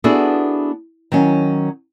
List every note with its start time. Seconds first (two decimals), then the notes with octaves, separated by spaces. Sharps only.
0.04 B3 D4 E4 F#4 G#4 A4
1.12 D#3 F#3 C#4